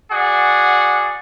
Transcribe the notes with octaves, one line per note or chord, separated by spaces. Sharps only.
F#4 G#4 D5 F#5